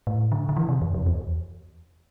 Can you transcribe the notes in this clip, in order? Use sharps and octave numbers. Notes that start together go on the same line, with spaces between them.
A2
D3
D3
E3
C3
F2
F2
E2